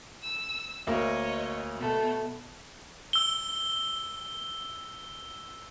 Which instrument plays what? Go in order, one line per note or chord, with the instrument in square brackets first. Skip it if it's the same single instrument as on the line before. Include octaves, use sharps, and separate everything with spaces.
[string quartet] E6
[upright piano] D2 A#3 [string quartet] C#5 D#5
[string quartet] B2 A3
[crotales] E6 G7